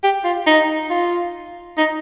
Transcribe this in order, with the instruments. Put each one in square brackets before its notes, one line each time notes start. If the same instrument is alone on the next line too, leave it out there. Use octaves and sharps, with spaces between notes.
[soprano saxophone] G4
F4
D#4
F4
D#4